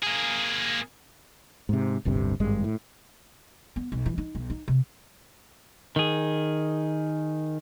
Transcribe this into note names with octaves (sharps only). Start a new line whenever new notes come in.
A#3 G#4
G#2 C3
D1 G1 G2 C3
G#1 G2 G#3
A2
B3
B1
E3
D#4
B1
D#4
C3
D#3 G#4